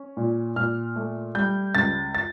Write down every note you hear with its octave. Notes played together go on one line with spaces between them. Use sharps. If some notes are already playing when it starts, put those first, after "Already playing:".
Already playing: C#4
A#2
A#2 F6
A3
G3 G6
C#2 A6
A6